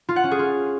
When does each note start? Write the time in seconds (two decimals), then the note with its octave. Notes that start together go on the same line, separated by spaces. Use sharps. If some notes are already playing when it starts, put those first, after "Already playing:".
0.09 F4
0.16 F#5
0.24 C#4
0.31 G#4
0.39 F4